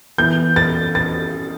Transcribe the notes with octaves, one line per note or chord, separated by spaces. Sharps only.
E3 B3 E4 G6
A6
A6